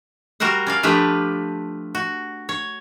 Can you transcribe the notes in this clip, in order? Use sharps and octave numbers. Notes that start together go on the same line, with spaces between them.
G3 F#4 A#4 C5 F#5
C#4 D5 F5
F3 A3 D4 G4 B4
F#4
C#5